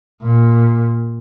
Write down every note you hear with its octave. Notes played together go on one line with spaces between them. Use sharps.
A#2